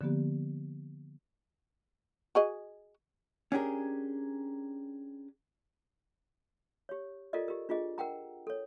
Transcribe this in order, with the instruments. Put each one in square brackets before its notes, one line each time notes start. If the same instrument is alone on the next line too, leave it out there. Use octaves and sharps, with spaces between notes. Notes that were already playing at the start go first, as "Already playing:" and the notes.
[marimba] D3 F3 A#3 B3 G4
[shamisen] F#4 G#4 D#5
[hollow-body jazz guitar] C#4 D4 G4 G#4 A#4
[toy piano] G4 C#5
F4 A4 A#4 D5 D#5
G4 A#4
D4 F4 G#4 D#5
A#4 F#5 G5 A#5
A4 C#5